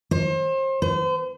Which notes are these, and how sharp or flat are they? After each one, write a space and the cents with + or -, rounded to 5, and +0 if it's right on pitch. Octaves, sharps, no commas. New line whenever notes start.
C5 +35
C5 -40